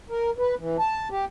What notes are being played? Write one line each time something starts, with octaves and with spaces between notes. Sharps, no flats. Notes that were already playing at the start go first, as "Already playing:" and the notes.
A#4
B4
E3
A5
G4